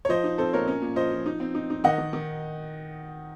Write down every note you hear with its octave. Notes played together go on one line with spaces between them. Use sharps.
C#5
F3 C5 D#5
D#4
C4 A4 C5
A#2 A#4 C#5
C#4
A#2
F3 C5 D#5
F3
D#4
C4
D#4
D#4
D#3 D#5 F#5
D#3
D#3